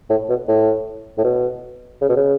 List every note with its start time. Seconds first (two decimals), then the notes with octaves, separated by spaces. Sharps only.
0.10 A2
0.30 B2
0.49 A2
1.18 A2
1.24 B2
2.01 C#3
2.09 B2
2.17 C#3